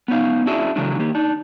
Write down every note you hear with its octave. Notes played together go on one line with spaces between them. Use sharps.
B3 C#4 D#4 F5
C#4 D4 E4 F#4 G#4
C#3 E3 F#3 G#3 D4
D#3 A#3 G4
D4 D#4